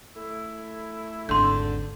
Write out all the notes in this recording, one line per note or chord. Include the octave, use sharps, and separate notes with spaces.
A3 E4
G#1 E2 D3 C6 G6